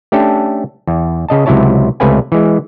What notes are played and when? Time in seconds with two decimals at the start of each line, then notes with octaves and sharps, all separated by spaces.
0.12 A3 C#4 D4 G4 A4
0.87 E2
1.29 C#3 D#5 A5
1.46 C#2 C3 F#3 E4 C#5 A5
2.00 C#2 C3 A3 B4 F5 G#5
2.32 E3 G#3